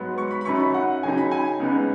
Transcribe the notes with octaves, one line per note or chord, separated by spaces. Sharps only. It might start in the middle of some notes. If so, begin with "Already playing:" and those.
Already playing: G#2 F#3 B3
C#6
B5
B5
F#2 F#3 D#4 C#6
B5
F#5
C#3 F#3 D#4 G#5
B5
G#5
C#2 C#3 B3 D#4